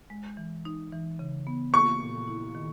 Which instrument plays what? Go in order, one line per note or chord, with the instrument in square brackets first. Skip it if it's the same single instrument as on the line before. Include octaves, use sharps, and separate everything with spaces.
[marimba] G#3
E3
D#4
E3
C#3
B3
[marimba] A#3 [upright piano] C#6
[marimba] A#2
E4
D#3